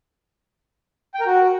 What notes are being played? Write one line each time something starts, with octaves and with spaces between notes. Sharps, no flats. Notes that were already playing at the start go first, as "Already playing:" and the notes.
G5
A#4
F#4